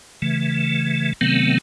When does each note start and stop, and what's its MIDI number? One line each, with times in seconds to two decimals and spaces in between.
0.22 1.13 49
0.22 1.13 52
0.22 1.13 57
1.21 1.58 48
1.21 1.58 51
1.21 1.58 54
1.21 1.58 57
1.21 1.58 59
1.21 1.58 60